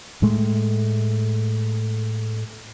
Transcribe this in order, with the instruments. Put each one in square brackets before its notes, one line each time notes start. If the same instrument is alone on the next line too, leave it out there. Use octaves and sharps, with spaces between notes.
[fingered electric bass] A2 G#3 A3